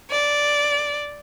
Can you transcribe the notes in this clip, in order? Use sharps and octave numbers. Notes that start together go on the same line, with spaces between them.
D5